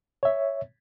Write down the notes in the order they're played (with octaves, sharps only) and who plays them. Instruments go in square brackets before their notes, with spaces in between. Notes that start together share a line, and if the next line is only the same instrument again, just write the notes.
[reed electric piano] C#5 E5